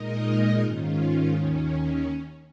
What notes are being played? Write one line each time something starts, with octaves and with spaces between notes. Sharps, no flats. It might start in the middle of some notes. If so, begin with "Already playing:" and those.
Already playing: A#2 G#3 D#4 A#4 D#5
G#2 D#3 C#4 F4
D#2 D#3 C#4